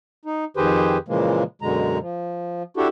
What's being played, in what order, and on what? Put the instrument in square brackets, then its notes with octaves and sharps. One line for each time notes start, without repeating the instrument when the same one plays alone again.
[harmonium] D#4
F2 D#3 G4 G#4 B4 C5
A#2 C#3 E3 F3 G#3 A#3
F#2 B2 D3 G#3 A#5
F3
D4 E4 F#4 G4 A4